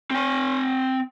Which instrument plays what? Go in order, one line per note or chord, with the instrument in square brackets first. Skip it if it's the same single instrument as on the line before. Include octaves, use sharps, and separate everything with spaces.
[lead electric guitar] C4 G#5